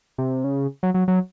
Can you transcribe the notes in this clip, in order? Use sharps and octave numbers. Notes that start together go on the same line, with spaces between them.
C3
C#3
F#3
F#3
F#3